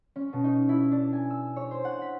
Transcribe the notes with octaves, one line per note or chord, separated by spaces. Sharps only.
C#4
B2
D#4
E4
D4
G#5
E6
C#5
C5
F#5
B6